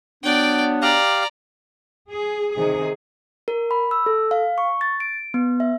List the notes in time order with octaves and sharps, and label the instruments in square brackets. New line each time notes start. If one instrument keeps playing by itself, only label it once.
[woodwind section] F#3 B3 D4 [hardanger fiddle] D5 G5
[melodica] G4 F5 [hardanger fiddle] D5 A#5
[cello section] G#4
C3 D#3 G#4
[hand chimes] A#4
B5
E6
A4
F5
C#6
A6
D7
B3
E5